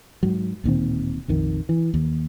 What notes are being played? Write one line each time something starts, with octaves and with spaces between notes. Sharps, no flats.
G#2 F#3
D1 A#2 D#3 C4
A#1 F2 D#3
E3
D#2